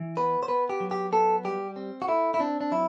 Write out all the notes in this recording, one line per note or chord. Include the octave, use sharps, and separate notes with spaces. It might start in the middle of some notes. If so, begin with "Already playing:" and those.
Already playing: E3
B3 B4
C5
B3 B4
G4
F#3
G4
B3 A4
G3 G4
C4
F#4
A3 E4
E4
C4 D4
D4
F#3 E4